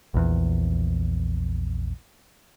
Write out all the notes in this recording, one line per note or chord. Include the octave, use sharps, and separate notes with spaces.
A#1 E2